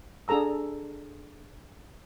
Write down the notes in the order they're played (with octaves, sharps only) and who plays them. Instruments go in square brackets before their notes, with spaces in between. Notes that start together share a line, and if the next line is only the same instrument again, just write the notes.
[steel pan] D4 G#4 A4 A#5 E6